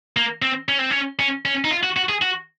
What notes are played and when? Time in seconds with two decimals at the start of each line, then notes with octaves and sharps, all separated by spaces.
0.17 A#3
0.42 C4
0.69 C#4
0.79 C4
0.91 C#4
1.19 C#4
1.45 C#4
1.64 D#4
1.71 F4
1.83 F#4
1.97 F#4
2.09 G#4
2.22 F#4